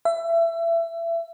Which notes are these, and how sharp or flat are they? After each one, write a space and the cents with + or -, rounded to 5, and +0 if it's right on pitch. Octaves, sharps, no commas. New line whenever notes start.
E5 +25